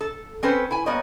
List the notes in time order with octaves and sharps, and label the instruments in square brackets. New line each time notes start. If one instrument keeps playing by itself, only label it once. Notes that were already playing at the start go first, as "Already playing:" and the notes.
[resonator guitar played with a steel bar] A4
C4 C#4 A4 B4 C5
E4 G#5
G3 A#3 B3 C#5 D#5